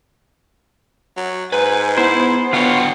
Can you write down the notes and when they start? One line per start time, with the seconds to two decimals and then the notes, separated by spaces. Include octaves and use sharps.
1.17 F#3
1.52 G#2 B4 G#5
1.97 B3 E4 C5
2.53 B2 D3 F4 C#5 F#5 G5